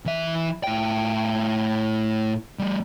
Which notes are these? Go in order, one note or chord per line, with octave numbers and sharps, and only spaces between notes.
E3 E5
A2 G5
G3 A3